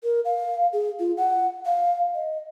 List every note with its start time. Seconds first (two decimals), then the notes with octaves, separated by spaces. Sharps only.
0.04 A#4
0.25 F5
0.73 G#4
0.99 F4
1.17 F#5
1.66 F5
2.15 D#5